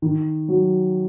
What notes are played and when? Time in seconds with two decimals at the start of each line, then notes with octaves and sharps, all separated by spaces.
0.02 D#3
0.49 F#3